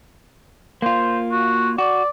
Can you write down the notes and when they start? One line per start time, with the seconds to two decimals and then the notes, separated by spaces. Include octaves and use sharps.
0.82 A#3 F4 C5
1.32 F#4
1.78 F#4 D5